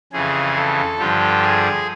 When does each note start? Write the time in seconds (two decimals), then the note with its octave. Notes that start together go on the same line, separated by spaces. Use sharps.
0.12 F2 C#3 E3 G#4
0.56 A4
0.99 G2 D3 F3 G4
1.42 G#4